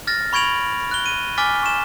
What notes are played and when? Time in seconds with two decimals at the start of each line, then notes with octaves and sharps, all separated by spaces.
0.07 F6 A6 A#6
0.33 B5 C#6 G#6 D7 F7 F#7
0.91 F#6 G7
1.06 D#7
1.38 G#5 D6 F6 A6 B6 G7
1.63 C#6 E7